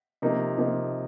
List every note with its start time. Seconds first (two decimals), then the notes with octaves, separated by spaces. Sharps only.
0.22 C3 F3 A#3 D#4
0.58 C3 F3 A#3 D#4